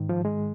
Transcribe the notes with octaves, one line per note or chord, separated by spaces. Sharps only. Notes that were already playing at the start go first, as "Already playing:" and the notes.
Already playing: G#2 D#3
F3
G#3